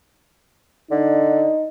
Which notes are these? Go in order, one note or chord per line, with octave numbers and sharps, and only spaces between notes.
D3 D#4